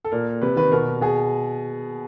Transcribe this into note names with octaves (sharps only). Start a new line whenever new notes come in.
A4
A#2 A#4
C3 B4
D#3 B4
B2 A#4
B2 G#4